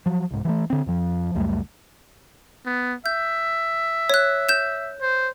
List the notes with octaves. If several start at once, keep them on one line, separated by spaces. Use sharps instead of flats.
F3 F#3
C2 G#2
E3 F#3 A3
D3 C4
F2 F3
C#2 F#2 G3 A3
B3
E5 G6
C#5 F#6
G6 E7
C5